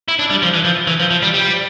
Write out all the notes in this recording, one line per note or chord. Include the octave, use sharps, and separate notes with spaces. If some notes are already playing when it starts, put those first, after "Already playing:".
E4
D4
G3
F3
E3
F3
E3
F3
F3
G3
G3